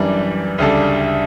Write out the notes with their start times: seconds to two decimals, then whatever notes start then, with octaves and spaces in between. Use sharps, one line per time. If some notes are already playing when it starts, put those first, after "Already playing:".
Already playing: F#2 E3 G3 D4
0.58 D2 C#3 G3 D4 A4